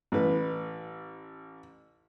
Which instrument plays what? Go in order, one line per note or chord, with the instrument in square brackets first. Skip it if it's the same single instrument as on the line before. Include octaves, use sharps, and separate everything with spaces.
[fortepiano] A1 B4